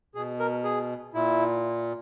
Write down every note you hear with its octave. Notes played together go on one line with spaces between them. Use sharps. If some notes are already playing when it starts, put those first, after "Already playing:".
B2 G#4
A#4
G#4
A#2 E4